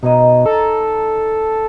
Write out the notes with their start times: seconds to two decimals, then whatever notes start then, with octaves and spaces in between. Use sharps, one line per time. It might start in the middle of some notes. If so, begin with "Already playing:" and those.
0.03 B2 D#4 C#5 D#5
0.46 A4 A#5